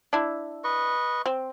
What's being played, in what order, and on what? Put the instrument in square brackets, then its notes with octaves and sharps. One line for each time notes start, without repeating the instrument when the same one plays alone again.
[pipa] D4 E4
[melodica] B4 D#5 C#6
[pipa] C4